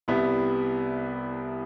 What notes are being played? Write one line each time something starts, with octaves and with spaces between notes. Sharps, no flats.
C2 C3 G3 B3 E4